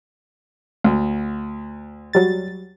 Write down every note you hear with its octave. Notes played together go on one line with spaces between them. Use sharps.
D2
F#3 G3 A6